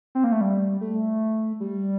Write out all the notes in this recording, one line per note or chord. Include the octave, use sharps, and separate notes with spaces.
C4
A#3
A3
G3
A3
G3